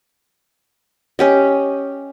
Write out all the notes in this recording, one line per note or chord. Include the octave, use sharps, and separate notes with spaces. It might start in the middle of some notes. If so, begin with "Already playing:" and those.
C#4 G4 D#5